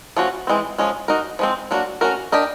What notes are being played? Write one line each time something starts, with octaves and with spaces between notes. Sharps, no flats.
F3 A3 C#4 F#4
E3 G#3 C4
F3 G#3 C#4
D#4 F#4 A#4
F3 G#3 C4
F#3 A#3 D4 F#4
A3 C#4 F#4 A#4
D4 G4 A#4 D#5